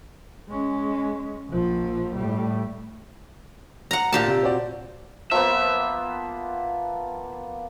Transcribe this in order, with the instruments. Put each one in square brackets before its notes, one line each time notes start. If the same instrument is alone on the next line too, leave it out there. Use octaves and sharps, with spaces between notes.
[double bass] G#3 C#4
A#1 F3
A2 G3
[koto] F#5 A#5
A#2 G4 A5
[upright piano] C3
C4 F#4 D5
[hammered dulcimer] F3 A#3 B3 [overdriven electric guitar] E5